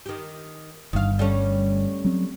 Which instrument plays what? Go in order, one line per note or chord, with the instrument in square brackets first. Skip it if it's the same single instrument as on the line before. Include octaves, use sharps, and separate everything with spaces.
[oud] D#3 G4
[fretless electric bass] G1 G2 [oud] D#3 F5
[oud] G3 A3 C#4
[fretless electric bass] F#3 C4